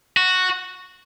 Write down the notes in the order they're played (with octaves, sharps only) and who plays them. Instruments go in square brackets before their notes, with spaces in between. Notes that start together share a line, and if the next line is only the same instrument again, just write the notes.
[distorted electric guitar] F#4